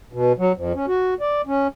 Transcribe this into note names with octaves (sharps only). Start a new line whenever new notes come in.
B2
F#3
F2
C#4
F#4
D5
C#4